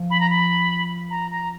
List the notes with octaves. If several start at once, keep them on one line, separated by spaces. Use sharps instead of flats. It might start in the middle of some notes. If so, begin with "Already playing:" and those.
Already playing: F3
B5
A#5
B5
A#5
A#5